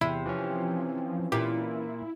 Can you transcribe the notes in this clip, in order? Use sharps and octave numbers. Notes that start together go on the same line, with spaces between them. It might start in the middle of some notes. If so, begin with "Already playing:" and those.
E2 C3 E4
E3 F3 C#4
A#2 E4 G4